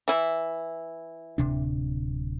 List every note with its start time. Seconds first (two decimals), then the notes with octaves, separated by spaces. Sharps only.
0.08 E3 E4
1.38 D1 C3 D4